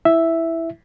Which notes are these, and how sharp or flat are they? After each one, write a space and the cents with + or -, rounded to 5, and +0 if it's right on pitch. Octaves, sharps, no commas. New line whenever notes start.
E4 +0 E5 +0